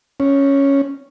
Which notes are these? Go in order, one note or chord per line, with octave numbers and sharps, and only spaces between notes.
C#4